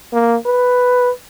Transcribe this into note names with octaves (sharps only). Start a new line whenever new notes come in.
A#3
B4